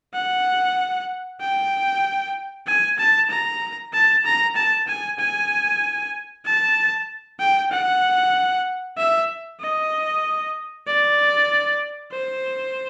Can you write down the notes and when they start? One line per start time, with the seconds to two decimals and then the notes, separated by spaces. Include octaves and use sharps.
0.14 F#5
1.41 G5
2.67 G#5
2.98 A5
3.30 A#5
3.93 A5
4.25 A#5
4.56 A5
4.87 G#5
5.19 G#5
6.46 A5
7.40 G5
7.71 F#5
8.98 E5
9.61 D#5
10.87 D5
12.12 C5